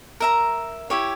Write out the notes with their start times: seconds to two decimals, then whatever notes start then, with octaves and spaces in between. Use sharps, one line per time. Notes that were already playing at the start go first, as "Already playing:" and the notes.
0.20 A#4 E5 A#5
0.90 E4 G4 C#5